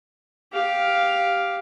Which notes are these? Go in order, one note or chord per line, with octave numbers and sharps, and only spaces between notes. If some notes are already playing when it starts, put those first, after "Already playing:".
G4 F5